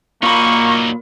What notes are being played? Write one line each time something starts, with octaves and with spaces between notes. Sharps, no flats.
A#2 F#3 A#3 D#4 B5 C#6